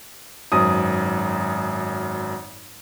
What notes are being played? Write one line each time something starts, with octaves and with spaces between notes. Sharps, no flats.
G#1 F#2 D#6